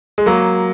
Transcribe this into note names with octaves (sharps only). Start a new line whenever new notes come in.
G#3
F#3 A#3